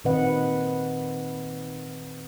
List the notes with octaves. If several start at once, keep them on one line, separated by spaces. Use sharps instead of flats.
A#2 D#3 C4 B4 D#5 F#5